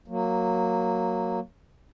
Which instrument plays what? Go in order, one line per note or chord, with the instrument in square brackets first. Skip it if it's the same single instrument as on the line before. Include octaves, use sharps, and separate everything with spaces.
[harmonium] F#3 A#3